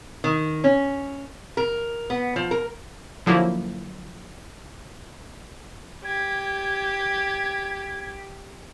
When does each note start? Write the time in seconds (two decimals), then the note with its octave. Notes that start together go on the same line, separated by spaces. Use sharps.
0.24 D#3
0.64 C#4
1.57 A#4
2.10 B3
2.36 F3
2.51 A#4
3.26 D3 F3 F#3 A#3 E4
6.04 G4 G#6